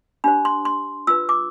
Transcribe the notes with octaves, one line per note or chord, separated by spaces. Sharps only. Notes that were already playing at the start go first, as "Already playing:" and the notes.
D4 G4 C5 B5
C6
C6
F4 B4 E6
D6